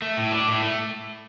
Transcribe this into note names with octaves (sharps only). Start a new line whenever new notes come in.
A3
A2
D4
A2
A3